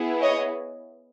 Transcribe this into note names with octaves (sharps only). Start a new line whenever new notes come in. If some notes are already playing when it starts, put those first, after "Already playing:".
Already playing: B3 E4 G#4
C#5 D#5